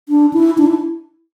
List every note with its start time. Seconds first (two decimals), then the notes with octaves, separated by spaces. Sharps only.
0.09 D4
0.33 E4
0.58 D4
0.67 E4